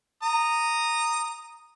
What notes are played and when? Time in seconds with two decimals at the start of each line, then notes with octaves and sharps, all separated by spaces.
0.23 A#5 D#6